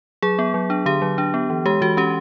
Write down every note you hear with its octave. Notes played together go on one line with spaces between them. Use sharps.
F#3 G#4
B3
F#3
D4
D3 G4
F#3
D4
B3
E3
G#3 G4
E3 F#4
C#4 G4